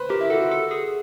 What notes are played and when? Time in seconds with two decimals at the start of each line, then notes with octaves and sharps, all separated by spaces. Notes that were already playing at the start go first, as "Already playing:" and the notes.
Already playing: B4 C5
0.09 G4 A#4
0.21 E4
0.30 F#4 A4
0.41 F#4
0.51 A4
0.71 G#4